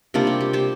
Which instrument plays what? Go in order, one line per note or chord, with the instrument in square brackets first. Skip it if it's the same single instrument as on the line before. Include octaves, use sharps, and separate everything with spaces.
[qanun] C3 G3 A#3 D4 F4
G4
G4
G4 C5